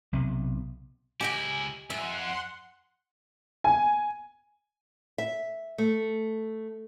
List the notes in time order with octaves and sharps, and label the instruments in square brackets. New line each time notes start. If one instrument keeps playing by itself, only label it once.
[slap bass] B1 C3 B3
[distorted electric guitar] C#2 E4 [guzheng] G4 D#5 G5 [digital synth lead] G#5
[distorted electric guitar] F2 [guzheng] E5 [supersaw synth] F#5 C6
[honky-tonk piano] G#5
[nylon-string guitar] E5
A3